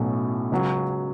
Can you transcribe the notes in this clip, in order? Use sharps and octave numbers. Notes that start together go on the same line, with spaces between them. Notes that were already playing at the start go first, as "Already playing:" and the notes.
Already playing: B1 A2 F#3 C#4
C#2 C#3 F#3